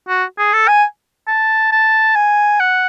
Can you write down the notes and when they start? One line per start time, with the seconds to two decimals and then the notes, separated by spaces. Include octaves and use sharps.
0.08 F#4
0.38 G#4
0.53 A4
0.68 G#5
1.27 A5
1.72 A5
2.16 G#5
2.60 F#5